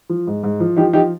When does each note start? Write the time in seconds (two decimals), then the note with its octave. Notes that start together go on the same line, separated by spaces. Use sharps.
0.09 F3
0.27 G#2
0.43 G#2
0.60 F3
0.76 F3 D#4 G4
0.93 F3 D#4 G4